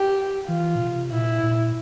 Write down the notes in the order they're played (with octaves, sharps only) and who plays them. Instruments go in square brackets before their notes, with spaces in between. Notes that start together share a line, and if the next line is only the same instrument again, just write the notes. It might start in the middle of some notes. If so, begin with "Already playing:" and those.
Already playing: [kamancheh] G4
[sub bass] E3 [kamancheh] F4
[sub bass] A#2
C3
[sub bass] A#2 [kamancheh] E4
[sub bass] A#2